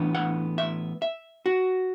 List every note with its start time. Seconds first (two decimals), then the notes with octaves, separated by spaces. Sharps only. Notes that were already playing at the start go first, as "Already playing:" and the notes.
Already playing: A2 E3 B3 D4
0.14 F#5
0.58 E5
1.02 E5
1.46 F#4